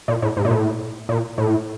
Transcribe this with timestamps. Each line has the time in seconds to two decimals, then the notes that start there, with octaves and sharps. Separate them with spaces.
0.08 A#2
0.22 A2
0.37 G#2
0.45 A#2
0.51 A2
1.09 A#2
1.38 A2